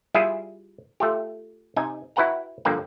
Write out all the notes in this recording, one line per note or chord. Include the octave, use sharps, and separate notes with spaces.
G3 E4 F4 G#4 E5
A3 F4 G4
C3 D#4 G#5
E4 F#4 B4 F#5 G5 A#5
G2 D3 F3 A#3 G5